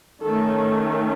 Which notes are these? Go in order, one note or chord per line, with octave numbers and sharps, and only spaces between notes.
D#3 A3 C#4 A4